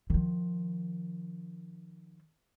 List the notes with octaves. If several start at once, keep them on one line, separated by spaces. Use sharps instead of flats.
D#3 F3